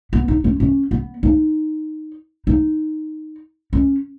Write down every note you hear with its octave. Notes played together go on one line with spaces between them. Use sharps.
B3
D#4
C#4
C#4
B3
D#4
D#4
C#4